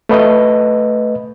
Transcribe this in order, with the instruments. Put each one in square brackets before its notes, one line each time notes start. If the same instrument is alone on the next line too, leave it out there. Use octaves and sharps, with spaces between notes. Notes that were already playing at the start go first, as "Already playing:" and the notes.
[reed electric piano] A3 B4 D#5